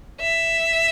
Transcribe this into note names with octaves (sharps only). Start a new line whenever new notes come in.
E5